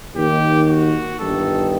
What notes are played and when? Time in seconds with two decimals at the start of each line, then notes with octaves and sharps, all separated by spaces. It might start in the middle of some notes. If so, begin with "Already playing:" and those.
0.14 D#2 D#3 G4
0.68 F#4
1.20 G1 G2 D#3 A4